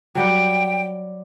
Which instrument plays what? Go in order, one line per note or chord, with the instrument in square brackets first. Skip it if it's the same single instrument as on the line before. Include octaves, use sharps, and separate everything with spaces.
[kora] F#3 G3 F#5 [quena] G5